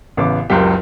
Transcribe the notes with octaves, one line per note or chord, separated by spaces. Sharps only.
A1 C#3 B3 D6
F#1 C#2 F#2 G4